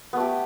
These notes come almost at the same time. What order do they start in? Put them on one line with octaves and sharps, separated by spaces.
B3 A3 G4